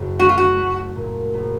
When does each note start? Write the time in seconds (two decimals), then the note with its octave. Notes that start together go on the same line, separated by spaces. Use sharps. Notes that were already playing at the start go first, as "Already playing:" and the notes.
Already playing: F#1 F#2
0.19 A3 F#4
0.29 F4
0.38 F#4
0.57 A3
0.96 A#2
1.34 A#1